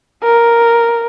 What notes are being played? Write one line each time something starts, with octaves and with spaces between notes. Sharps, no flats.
A#4